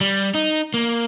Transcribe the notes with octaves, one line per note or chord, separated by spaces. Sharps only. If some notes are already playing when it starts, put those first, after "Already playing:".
G3
D#4
A#3